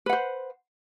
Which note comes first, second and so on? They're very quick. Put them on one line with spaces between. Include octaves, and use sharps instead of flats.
B4 F#5 C5